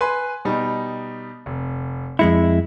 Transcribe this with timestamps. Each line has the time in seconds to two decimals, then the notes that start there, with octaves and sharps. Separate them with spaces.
0.01 B4 G#5 C6
0.45 B2 G3 D#4
1.46 F1
2.19 F2 G#3 E4 C#7